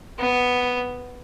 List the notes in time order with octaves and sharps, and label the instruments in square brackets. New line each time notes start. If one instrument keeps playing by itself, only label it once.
[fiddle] B3